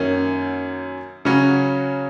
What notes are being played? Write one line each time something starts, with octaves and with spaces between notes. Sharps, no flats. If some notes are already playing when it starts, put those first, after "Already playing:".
Already playing: F#2 D#3 A#3 C#4
C#3 F#3 C#4 F#4 C#5